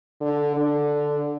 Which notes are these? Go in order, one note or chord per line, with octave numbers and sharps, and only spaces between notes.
D3
D3